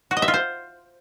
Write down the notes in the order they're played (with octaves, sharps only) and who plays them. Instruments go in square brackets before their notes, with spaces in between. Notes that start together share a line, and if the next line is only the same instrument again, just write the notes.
[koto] F#4
D#5
E5
F4
C5